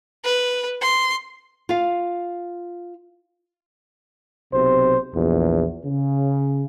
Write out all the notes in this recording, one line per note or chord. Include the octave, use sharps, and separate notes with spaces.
B4
C6
F4 F5
B1 C3 C5
A#1 E2
C#3